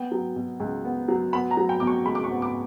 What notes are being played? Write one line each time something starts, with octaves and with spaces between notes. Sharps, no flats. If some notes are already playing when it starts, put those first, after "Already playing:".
Already playing: B3 G5
F#3
B2
C#2
B3
F#3
B3 B5
A#5
F#3
G5
B2 D6
C#6
C#2 B5
D6
C#6
B3
D6